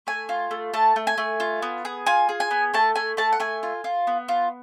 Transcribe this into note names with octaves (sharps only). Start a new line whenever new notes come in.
A3 G#5
F4
A3
A3 A5
A3
G#5
A3
F4
B3
G#4
F4 G#5
G#4
G#5
B3
A3 A5
A3 G#5
A3 A5
F#5
A3 G#5
F4
F4
B3
F4